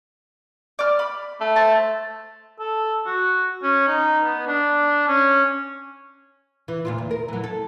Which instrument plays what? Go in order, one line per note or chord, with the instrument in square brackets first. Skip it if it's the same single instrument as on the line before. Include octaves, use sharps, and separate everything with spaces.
[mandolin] D5 D6 F6
B5
[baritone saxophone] A3
[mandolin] C5 [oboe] A5
[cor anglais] A4
F#4
C#4
D#4
B3
D4
C#4
[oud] E3
D2 A#2 F4
E2
A#4
E3 F#3
A4